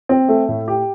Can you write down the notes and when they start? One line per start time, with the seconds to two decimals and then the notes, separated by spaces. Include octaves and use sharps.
0.09 C4
0.29 A3
0.48 A2
0.68 G4